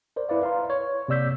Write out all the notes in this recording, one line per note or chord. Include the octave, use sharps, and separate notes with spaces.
A#4 C5 D5
E4 B4 D5 F5
B4 F5 A#5 C6
C#5
C3 A#3 D5 E6 G6 B6